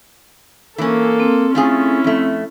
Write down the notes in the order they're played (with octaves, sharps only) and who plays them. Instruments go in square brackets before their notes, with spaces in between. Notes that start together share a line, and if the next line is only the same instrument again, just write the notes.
[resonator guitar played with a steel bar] E3 C#4 [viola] A#3 A4
[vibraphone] C4
[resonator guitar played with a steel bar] A3 F4 G#4 [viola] C#4 E4
[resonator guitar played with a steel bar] F2 A3